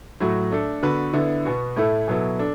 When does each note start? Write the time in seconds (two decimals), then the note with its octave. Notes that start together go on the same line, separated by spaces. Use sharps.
0.20 A2 F#3 A3 F#4
0.52 A3 D4 A4
0.83 D3 B3 F#4 B4
1.13 D3 B3 E4
1.45 B2 B3 F#4
1.76 A2 A3 E4 A4
2.08 B2 F#3 B3 E4 A4
2.39 D4 A4